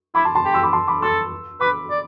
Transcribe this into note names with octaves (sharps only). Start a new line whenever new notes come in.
E4 B5 D6
A5 C6
A5 C6
G4
C6 E6
B5 D6
A5 C6
B5 D6
A4 C6 E6
B4 B5 D6
D5